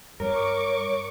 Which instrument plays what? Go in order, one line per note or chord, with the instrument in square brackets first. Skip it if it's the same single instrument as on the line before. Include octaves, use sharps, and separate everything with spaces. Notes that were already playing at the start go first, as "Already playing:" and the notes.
[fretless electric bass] G2 [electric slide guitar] A#4 [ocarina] C#5 [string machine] C#6 D6